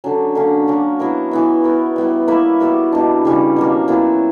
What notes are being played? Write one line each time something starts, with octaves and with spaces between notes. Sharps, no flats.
D3 F#3 C#4
D3 A#3 C#4
A#3 C#4 F#4
F#3 B3 E4 A#4
E3 B3 E4
B3 F#4 A#4
G3 B3 E4
A#3 E4 B4 E5
G3 B3 F#4 A#4
B2 A#3 D4
C#3 E3 G3 C#4
B2 F#3 A#3
A#2 F#3 B3 E4